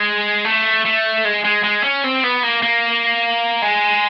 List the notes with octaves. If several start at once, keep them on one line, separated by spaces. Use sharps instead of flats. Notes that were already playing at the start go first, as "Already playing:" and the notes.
Already playing: G#3
A3
A3
G#3
G#3
G#3
C#4
C4
B3
A#3
A#3
G#3